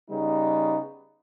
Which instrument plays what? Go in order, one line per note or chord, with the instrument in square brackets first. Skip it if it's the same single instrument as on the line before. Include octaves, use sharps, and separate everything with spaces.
[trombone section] C#3 G3 B3 D#4